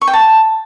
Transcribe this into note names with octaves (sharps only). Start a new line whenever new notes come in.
C#6
G5
A5